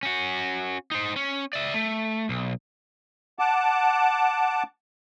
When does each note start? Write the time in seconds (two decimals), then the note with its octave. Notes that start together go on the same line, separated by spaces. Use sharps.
0.03 C#4 F#4
0.91 D#4 C5
1.16 C#4
1.53 D5 E5
1.74 A3
2.29 B1
3.39 F#5 A5 D6